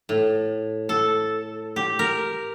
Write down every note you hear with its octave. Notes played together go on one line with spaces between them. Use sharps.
A2
A4
G4
A#4